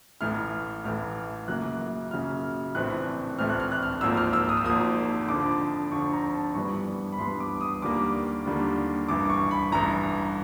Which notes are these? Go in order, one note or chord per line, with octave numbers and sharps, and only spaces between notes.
A1 A2 E3 F6
A1 A2 E3 F6
F#2 C#3 F#3 A#3 F#6
F#2 C#3 F#3 A#3 F6
A#1 A2 E3 A3 C4 F#6
A#1 A2 E3 A3 C4 F6
F#6
F6
F#6
F6
G#1 G#2 F3 A#3 E6
F6
E6
D#6
E6
G#1 G#2 F3 A#3 D#6
F2 D3 F3 D6
F2 D3 F3 C#6
A#5
A5
G2 E3 G3 B3 C#6
B5
G2 E3 G3 B3 C6
D6
D#6
D#2 D3 G3 A#3 D6
D#2 D3 G3 A#3
A1 G2 E3 D6
C#6
B5
A1 G2 E3 A#5